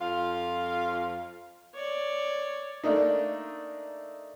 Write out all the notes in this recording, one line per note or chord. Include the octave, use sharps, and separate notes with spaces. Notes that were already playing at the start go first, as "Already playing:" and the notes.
F2 F4 F5
C#5 D5
A3 A#3 D4 D#4